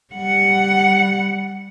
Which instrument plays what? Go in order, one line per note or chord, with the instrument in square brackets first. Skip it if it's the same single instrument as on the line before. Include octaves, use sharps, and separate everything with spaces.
[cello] G3 F#5